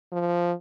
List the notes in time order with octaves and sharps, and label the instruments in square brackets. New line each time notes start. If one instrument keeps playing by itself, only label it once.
[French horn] F3